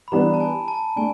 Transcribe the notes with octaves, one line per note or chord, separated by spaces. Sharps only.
B5
E3 G3 B3 D4 A#5
A5
G#5
A5
A3 D4 G#5